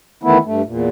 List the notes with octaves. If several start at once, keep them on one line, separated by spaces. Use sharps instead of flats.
D#3 E3 A3 B3 E4
G2 A3
E2 A#2